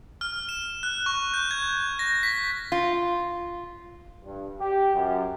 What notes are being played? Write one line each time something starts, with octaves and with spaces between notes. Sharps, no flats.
F6
E7
F#6
C#6
G6
G#6
A#6
B6
F4
G2
G4
F#2